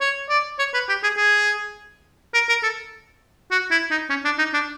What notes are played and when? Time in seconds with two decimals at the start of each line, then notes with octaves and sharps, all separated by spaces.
0.01 C#5
0.29 D5
0.59 C#5
0.74 B4
0.89 G4
1.03 G#4
1.17 G#4
2.34 A#4
2.49 A#4
2.63 A4
3.51 F#4
3.71 E4
3.90 D#4
4.10 C#4
4.25 D4
4.38 D#4
4.53 D4